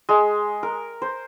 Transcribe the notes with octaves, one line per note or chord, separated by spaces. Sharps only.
G#3
A#4
C5